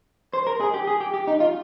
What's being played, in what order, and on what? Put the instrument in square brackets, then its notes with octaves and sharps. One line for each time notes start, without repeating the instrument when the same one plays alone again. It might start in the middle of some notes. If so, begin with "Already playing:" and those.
[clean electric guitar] C5
A#4
G#4
G4
G#4
G4
G4
D#4
F4